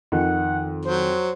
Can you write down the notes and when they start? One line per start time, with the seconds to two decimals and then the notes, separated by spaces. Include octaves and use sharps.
0.12 F2 D#3 F#5
0.85 F#3 C5